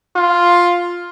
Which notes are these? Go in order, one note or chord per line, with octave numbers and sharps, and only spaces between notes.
F4